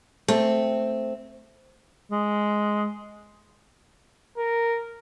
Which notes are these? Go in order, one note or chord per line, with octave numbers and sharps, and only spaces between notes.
A3 C4
G#3
A#4